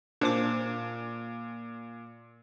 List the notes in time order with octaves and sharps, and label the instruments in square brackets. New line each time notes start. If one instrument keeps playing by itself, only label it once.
[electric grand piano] A#2 [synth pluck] D4 C5 D6